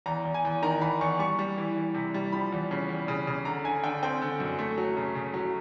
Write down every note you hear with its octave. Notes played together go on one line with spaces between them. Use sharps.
E2 A#5
E2
G#5
E2
D#3 A#5
E2 B5
E2 C#6
G3 C#6
G3
E3
E3
C3
G3
F3 B5
E2
C#3
E2
C#3
C#3
D3 A#5
D3 G#5
D3 G5
C4 G5
D3
F#2
A3
F#3
C#3
C#3
F#3